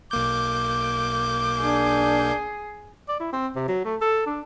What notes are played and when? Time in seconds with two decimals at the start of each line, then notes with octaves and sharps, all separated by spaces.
0.11 B1 A#3 D6 G6
1.61 D4 G#4
3.09 D5
3.20 E4
3.33 C4
3.55 C3
3.68 F#3
3.85 A3
4.01 A4
4.26 D4